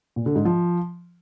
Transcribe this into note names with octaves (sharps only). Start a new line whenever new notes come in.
A#2
D3
G#2
F3